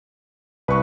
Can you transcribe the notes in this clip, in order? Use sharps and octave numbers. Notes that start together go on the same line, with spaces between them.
C2 B4 C#6